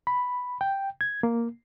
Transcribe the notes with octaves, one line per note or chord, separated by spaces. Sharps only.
B5
G5
G#6
A#3